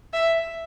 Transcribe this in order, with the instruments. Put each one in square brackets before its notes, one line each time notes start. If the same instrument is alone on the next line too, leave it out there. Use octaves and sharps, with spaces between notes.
[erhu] E5